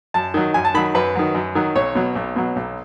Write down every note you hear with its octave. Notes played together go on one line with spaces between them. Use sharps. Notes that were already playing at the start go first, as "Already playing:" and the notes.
F#2 A5
D#3 F#3
F#2 G#5
A5
D#3 F#3 B5
F#2 B4
D#3 F#3
F#2
D#3 F#3
B1 C#5
B2 F#3
B1
B2 F#3
B1